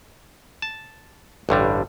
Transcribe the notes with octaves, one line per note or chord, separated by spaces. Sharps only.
A5
A1 G2 D3 G3